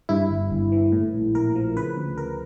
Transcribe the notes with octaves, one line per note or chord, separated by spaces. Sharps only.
G2 E4
G1
G1
E3
A2
A#1
A#1 A#4
F3
C#3 B4
D2
D2 A#4